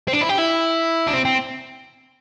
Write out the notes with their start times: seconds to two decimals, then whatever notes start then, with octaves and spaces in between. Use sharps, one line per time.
0.08 C4
0.13 D4
0.22 E4
0.29 G4
0.38 E4
1.07 D4
1.13 C4
1.25 C4